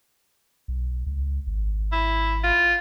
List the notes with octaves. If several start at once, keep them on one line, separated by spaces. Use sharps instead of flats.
B1
C#2
G#1
E4
F4